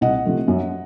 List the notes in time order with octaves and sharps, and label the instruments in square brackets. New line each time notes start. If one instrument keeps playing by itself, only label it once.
[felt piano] C2 D#5 F#5
C3 F3 A3
F#2